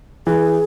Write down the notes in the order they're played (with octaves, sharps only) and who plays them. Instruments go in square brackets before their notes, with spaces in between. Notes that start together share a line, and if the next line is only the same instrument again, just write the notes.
[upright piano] E3 [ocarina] G#4